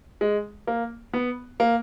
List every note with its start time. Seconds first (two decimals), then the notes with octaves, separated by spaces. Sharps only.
0.21 G#3
0.67 A#3
1.13 B3
1.60 A#3